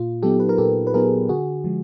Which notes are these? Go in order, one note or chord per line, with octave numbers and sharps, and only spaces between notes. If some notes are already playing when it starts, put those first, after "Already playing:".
Already playing: A#2 F4
F#3 B3 D#4 G4 A4
B4
A#4
A#2 G4 A4
B4
F#3 B3 D#4 G#4 A#4
D3 F#4 G#4
F3 G#3